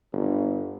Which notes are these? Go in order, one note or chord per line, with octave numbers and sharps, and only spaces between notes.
G1